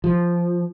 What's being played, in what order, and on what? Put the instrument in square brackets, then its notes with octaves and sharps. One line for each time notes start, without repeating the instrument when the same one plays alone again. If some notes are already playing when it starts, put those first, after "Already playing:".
[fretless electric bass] F3